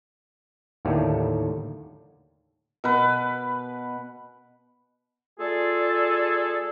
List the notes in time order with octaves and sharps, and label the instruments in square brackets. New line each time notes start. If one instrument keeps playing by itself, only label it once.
[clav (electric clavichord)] D#2 A2 D3 A3 A#3 G4
[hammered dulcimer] B2 B4
[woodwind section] A3 F4 G#4 A4 D5